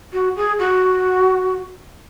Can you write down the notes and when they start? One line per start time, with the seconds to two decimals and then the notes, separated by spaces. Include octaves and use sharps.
0.13 F#4
0.36 G#4
0.59 F#4